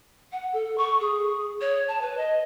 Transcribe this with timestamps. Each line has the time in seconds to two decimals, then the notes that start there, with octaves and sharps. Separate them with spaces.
0.32 F#5
0.53 A4
0.77 C#6
1.00 G#4
1.61 C#5
1.88 A5
2.01 B4
2.17 D#5